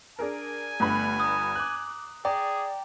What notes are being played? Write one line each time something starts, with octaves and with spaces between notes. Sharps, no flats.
D4 G#4 A#4 G#5
G1 G2 A3 B5
A#5 D#6
D6 F#6
G#4 D5 G5 A#5